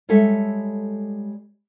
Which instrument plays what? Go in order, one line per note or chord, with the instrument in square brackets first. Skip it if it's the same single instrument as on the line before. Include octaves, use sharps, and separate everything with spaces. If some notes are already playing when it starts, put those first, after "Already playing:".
[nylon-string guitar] G3 G#3 G4 A4 C#5 E5